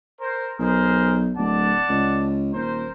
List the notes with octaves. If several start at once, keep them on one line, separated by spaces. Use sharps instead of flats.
A#4 C5
B1 G#4 A#4 C5
D1 D5 F#5 A5
C#2
D#1 A#4 C5